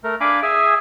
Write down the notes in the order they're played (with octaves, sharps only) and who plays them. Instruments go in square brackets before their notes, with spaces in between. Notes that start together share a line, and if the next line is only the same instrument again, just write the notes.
[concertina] A3 A#4
D4 F5 G#5 B5 D6
G#4 E5 G#5